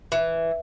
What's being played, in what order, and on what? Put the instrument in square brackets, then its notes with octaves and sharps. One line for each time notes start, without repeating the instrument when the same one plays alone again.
[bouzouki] E3